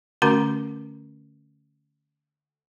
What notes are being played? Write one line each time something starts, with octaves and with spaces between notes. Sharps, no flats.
D3 A3 C#4 F#4 A#4 A#5